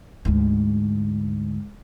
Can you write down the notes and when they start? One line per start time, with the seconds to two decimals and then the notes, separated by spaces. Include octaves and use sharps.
0.25 D2 G#2